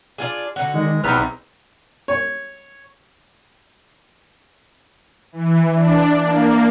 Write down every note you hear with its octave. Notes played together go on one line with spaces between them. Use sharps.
D4 F4 G#4
D3 F#4
D#3 G#3
B1 E2 C4 D#4 B4 A#5 F6
C#5
E3
D4
A#3